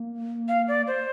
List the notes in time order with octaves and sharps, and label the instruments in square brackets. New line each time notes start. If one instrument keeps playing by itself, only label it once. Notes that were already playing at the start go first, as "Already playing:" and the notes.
Already playing: [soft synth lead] A#3
[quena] F5
D5
C5